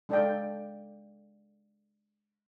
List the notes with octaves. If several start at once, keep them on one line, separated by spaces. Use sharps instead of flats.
G#3 D4 A4 D5 F5 G5